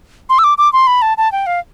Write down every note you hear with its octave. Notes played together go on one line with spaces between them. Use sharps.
C6
E6
D6
D6
C6
B5
A5
A5
G5
F5